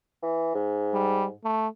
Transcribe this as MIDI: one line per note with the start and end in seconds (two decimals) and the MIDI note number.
0.22 0.53 52
0.54 1.35 44
0.93 1.26 55
1.44 1.68 57